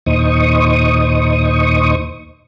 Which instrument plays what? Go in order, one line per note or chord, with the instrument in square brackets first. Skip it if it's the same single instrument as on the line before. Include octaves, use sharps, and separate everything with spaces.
[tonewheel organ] D#2 A#2 D#4 C5 C#6 D#6